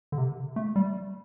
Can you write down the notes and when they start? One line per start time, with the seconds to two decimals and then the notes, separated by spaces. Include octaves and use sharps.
0.12 D3
0.18 C3
0.56 A3
0.76 G3